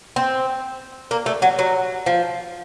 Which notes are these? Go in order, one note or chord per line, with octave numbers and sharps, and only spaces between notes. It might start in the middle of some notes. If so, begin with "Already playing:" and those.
C4
A#3
A3
F#3
F#3
F3